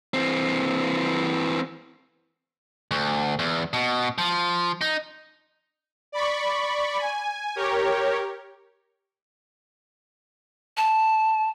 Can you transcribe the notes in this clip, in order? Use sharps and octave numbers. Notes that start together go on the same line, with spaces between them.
E3 C4
D2
E2
B2
F3
D#4
D5 B5 C#6
G#5
G4 A#4 C#5
A5